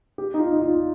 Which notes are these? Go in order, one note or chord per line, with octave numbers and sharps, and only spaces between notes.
G4
D#4
F4
D#4
F4